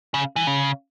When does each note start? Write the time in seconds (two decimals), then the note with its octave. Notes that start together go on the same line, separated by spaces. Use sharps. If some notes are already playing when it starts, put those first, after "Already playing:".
0.14 C#3
0.36 E3
0.47 C#3